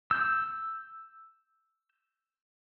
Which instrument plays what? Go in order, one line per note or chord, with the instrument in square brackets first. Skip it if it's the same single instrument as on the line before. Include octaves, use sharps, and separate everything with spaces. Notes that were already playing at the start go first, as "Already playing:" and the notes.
[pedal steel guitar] E6 G6